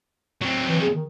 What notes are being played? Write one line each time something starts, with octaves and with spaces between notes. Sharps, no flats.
F#3 C4
E3
G#4
D#3